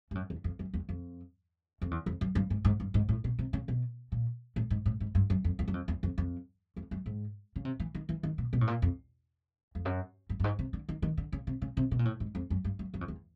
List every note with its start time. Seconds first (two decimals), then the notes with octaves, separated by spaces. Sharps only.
0.11 G2
0.15 F#2
0.30 E2
0.44 F2
0.59 F#2
0.74 E2
0.89 F2
1.82 F2
1.91 E2
2.06 F2
2.21 F#2
2.35 G2
2.50 G#2
2.65 G#2
2.80 G2
2.94 G#2
3.09 A2
3.24 B2
3.39 C3
3.53 C#3
3.68 B2
4.12 A#2
4.56 A2
4.70 G#2
4.86 A2
5.00 G#2
5.15 G2
5.30 F#2
5.44 F2
5.59 E2
5.68 F#2
5.74 F2
5.88 E2
6.03 F2
6.18 F2
6.76 F2
6.91 F#2
7.06 G#2
7.56 C#3
7.65 C3
7.80 E3
7.95 D#3
8.09 E3
8.23 D#3
8.38 B2
8.53 B2
8.61 A2
8.67 A#2
8.82 F2
9.75 F2
9.85 F#2
10.29 G2
10.40 G2
10.44 G#2
10.59 C3
10.73 D3
10.89 D#3
11.02 D#3
11.18 D3
11.32 C#3
11.47 C3
11.62 C#3
11.77 C3
11.91 B2
11.99 A#2
12.05 A2
12.20 G#2
12.35 F2
12.50 F#2
12.64 G2
12.79 F#2
12.94 F#2
13.01 F2
13.08 E2